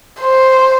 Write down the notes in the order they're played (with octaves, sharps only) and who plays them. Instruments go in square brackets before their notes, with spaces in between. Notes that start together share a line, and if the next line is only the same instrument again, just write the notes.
[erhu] C5